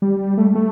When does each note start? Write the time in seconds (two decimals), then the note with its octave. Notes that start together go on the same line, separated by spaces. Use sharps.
0.02 G3
0.38 A3
0.55 A3